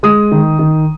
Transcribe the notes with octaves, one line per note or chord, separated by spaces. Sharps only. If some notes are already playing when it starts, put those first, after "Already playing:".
G#3 D#6
D#3
D#3